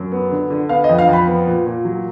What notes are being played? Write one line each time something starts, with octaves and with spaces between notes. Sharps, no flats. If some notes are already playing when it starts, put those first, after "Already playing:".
Already playing: F#2
B3
D3
D3
B3 F5
D#5
F2
F5
F2 B5
B3
A#2
A#2
F#3